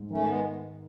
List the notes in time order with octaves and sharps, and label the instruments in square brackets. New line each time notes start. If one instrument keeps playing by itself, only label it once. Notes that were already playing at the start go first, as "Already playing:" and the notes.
Already playing: [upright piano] G#2
[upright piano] D#3 [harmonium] A3 C#4
[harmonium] G#3 B3